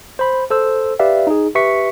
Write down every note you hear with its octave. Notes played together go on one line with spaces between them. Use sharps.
C5 B5
A4 C5 E6
G4 B4 D5 E5 F5
D#4 G#4
G4 B4 E5 C#6 B6 C#7